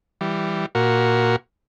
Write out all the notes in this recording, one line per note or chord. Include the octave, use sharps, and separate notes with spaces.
E3 G3
A#2 F#4 A#4